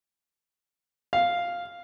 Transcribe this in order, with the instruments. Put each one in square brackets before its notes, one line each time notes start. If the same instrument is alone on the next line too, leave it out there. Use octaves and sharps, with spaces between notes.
[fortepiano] F5